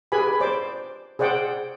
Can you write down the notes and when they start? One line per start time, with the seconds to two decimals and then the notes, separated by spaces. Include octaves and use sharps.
0.12 G4 G#4 B4 G#5 B5
0.40 C5 D5 D6
1.19 G#4 C5 D5 F#5 G5